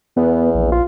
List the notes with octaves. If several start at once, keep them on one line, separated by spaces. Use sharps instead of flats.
E2 B3
A#1
F4